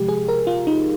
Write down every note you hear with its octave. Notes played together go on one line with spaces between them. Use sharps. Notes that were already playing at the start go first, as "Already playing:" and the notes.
Already playing: C3 F3 G#3 G4
G#4
A#4
F4
D#4